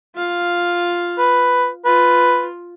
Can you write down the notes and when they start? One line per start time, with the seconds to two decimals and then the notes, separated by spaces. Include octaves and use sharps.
0.15 F4 F5
1.19 B4
1.85 F4 B4